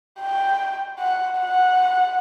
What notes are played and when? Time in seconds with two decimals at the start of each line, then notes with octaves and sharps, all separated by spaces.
0.21 G5
0.99 F#5
1.39 F#5